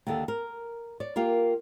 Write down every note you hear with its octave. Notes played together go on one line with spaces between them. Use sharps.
D#2 D3 A4
A#4
C#5 D5
A#3 F4 G4 A#4